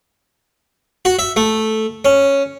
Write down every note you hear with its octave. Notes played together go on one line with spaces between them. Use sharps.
F#4
E5
A3
C#4